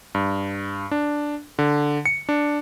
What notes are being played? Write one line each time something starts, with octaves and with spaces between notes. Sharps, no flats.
G2
D4
D3
C#7
D4